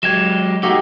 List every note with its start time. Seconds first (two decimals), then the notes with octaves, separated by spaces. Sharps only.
0.03 F#3 G#3 G4 G#6 E7
0.63 A3 A#3 D#4 F#4 G4